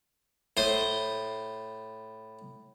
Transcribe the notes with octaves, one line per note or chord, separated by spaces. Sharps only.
A2 C5 D#6